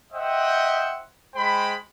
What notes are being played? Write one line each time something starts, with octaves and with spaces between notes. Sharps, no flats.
C5 D#5 E5 F#5 G5
G#3 C5 G5 B5